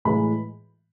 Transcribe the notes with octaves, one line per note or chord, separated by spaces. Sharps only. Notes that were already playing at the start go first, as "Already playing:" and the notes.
A2 E3 G#3 B5